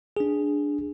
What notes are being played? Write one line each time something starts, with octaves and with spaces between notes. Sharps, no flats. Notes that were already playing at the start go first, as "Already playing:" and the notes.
D4 G#4